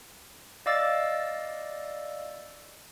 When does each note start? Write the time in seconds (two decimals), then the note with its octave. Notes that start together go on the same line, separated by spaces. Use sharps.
0.66 D5 D#5 F5 D6 E6 A6